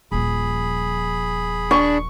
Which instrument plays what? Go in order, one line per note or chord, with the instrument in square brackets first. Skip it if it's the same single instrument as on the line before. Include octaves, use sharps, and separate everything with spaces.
[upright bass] D#1 F3 [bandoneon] G#4 B5
[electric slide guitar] D4 [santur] C#6